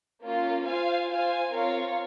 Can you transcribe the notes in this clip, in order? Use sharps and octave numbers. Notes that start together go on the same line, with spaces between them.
A#3 C#4 F4
F4 C5 F5 G#5
F4 C5 F5 G#5
C4 F4 A#4 C#5 F5